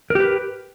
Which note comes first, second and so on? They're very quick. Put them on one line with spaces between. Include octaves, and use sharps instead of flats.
A#4 G4 B4